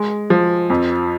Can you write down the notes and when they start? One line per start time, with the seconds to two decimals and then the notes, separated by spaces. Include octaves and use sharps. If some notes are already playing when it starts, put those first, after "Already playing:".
Already playing: G#3
0.30 F3
0.70 F2